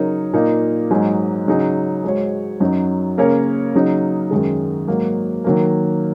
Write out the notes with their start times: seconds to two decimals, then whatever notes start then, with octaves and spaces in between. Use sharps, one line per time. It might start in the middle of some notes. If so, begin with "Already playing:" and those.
Already playing: C#3 F#3 D#4 A#4 C#5
0.33 A#2 A#3 D#4
0.91 G#2 F#3 D#4 G#4
1.47 C#3 F#3 D#4 G#4
2.04 G#2 G#3 F#4 C#5
2.60 F#2 F#3 D#4
3.18 C#3 A#3 C#4 A#4 C#5
3.75 C#3 F#3 D#4
4.31 F#2 D#3 G#3
4.87 G#2 F#3 A#3 F#4
5.44 D#3 F#3 A#3